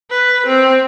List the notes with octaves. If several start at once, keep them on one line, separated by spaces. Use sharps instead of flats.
B4
C4